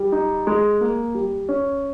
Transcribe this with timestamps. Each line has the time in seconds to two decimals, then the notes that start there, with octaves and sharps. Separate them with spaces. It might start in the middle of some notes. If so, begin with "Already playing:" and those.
Already playing: G3
0.12 D#4
0.47 G#3
0.81 A#3
1.15 G3
1.49 C#4